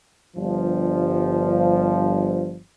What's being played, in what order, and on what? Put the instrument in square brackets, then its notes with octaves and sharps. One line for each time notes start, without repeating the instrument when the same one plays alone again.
[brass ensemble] G1 G2 F3